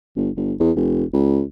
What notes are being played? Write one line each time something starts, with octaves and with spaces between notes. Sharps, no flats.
G1
G1
E2
F1
C#2